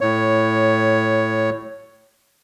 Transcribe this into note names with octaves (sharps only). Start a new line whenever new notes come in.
A2 C#5